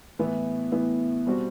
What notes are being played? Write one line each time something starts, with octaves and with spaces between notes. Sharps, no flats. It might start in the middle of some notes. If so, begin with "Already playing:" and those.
A2 E3 B3 E4
A2 E3 B3 E4
B2 G3 C4 F#4